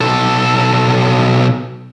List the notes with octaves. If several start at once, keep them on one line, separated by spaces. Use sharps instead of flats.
B1 A4